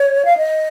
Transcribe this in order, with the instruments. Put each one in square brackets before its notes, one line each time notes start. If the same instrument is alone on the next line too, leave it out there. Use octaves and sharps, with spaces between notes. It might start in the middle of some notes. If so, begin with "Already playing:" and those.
Already playing: [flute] C#5
F5
D#5